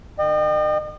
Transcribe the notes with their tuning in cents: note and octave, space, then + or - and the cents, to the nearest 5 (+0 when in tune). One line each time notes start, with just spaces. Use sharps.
D#3 -45 D#5 -40 G5 +0